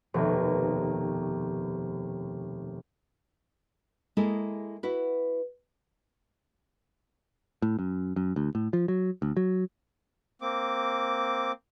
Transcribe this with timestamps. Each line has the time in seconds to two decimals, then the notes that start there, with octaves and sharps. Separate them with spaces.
0.14 F1 D#2 B2
4.17 G#3 A#3 E4 G#4 A4
4.83 E4 F#4 B4
7.62 A2
7.79 F#2
8.16 F#2
8.36 D2
8.55 A2
8.73 F3
8.88 F#3
9.22 D2
9.37 F#3
10.41 A#3 C4 D6